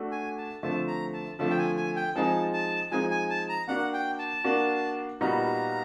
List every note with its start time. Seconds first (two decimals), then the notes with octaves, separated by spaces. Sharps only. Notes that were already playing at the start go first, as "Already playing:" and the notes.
Already playing: A3 D4 F#4
0.12 G#5
0.38 A5
0.63 D3 F3 A3 C4 A5
0.88 A#5
1.14 A5
1.39 D3 F3 A3 C4 A5
1.50 G5
1.58 G#5
1.77 G#5
1.96 G5
2.15 F3 G#3 C4 D#4 G#4 A5
2.53 A5
2.92 F3 G#3 C4 D#4 G#4 G#5
3.11 G#5
3.30 A5
3.49 A#5
3.68 A#3 D4 F#4 A#4 F#5
3.93 G5
4.19 A5
4.44 A#3 D4 F#4 A#4
5.21 A#2 G3 B3 D#4 F#4 A#5